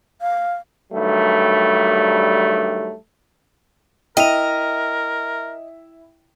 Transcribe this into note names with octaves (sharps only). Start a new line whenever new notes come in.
F5
G2 D#3 F#3 G3 A3
E4 A#4 D#5 E5 G5 D#7 F7